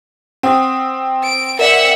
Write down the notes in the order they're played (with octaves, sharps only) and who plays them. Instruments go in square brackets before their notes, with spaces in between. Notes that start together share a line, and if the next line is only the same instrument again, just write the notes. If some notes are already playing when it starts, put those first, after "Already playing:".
[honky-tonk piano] C4 [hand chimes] F#5 D#6
[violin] D7
[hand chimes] A#4 D5 G5 [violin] E5 F#5